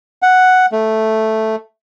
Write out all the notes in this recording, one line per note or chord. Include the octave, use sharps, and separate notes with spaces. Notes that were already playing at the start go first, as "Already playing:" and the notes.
F#5
A3